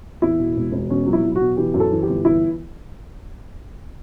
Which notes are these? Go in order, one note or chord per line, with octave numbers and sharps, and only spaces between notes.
E2 E4
B2
E1
E1
B2 C#4
F#3
E4
F#3
F#4
B2
E3 G4
F#2
A4
E3
G4
G1
E3 E4